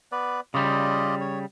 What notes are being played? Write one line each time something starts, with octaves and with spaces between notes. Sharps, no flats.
B3 B4 D5
C#3 G3 F4 D5 D#5
C#5